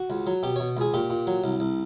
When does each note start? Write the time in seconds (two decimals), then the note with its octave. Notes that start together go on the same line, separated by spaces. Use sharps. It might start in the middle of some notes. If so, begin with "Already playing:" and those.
Already playing: F#4
0.10 C#2
0.27 F#3
0.43 B2 G4
0.56 B2 C#5
0.77 C#2 G#4
0.94 A#2 G4
1.10 A#2
1.27 F#3
1.44 C2
1.60 C2